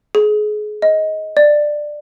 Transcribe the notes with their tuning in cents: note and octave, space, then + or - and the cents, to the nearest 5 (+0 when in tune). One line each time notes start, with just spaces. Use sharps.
G#4 +30
D#5 +15
D5 +15